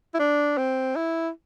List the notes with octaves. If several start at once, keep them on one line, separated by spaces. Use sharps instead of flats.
E4
D4
C4
E4